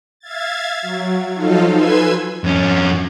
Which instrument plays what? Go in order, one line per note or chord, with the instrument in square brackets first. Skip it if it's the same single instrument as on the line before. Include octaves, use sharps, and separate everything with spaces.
[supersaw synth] E5 F5 G#6 A6
F#3
F3 F#3 D#4 F4 A4 F5
B4 G#5 C6 E6 G#6
[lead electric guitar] F2 C#4